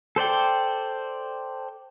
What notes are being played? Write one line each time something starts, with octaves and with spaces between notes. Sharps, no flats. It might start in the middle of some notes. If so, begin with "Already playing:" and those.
A4 C5 D5 G5